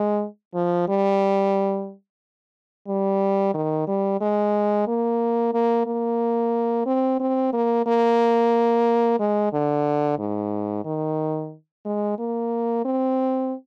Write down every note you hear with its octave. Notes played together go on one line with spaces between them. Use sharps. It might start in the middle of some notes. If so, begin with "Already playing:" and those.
Already playing: G#3
F3
G3
G3
D#3
G3
G#3
A#3
A#3
A#3
C4
C4
A#3
A#3
G#3
D3
G#2
D#3
G#3
A#3
C4